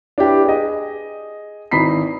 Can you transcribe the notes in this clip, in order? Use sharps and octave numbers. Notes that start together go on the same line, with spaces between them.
D4 E4 G4 B4
G#4 D#5
G#1 E3 D#4 B5 B6 C7